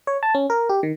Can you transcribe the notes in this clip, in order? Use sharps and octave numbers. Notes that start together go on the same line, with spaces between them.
C#5
A5
C#4
A#4
G4
D#3